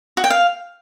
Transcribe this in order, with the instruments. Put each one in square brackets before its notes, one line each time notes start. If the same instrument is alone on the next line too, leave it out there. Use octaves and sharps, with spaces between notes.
[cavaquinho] F#4
G5
F5